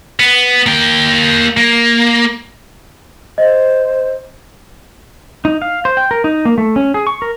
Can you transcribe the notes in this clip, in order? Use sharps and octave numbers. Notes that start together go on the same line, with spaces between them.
B3
A#3 G5
A#3
C5 D#5
D#4
F5
C5
G5
A#4
D#4
A#3
A3
C#4
G#4
C#6
A#4